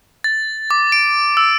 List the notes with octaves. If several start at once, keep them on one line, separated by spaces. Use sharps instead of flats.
A6
D6
D7
E6